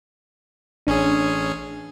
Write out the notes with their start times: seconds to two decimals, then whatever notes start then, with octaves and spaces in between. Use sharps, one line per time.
0.87 A1 C#4 D4 G#4